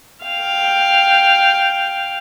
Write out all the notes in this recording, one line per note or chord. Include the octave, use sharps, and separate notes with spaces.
F5 G5